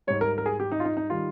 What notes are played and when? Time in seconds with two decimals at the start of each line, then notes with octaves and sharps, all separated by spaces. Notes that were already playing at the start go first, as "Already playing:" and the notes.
0.07 G#2 G3 C#5
0.21 A#4
0.38 A#4
0.46 G#4
0.60 G4
0.72 D#4
0.80 F4
0.85 D#4
0.97 D#4
1.10 D#3 G3 F4